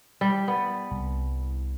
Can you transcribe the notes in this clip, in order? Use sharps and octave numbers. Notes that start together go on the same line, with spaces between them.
G3
B3
C2